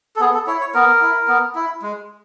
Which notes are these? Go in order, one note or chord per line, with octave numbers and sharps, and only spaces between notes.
A4
B3 G#4
A4
E4 C#5
C#5
B3 A#4
E4
B3
E4
G#3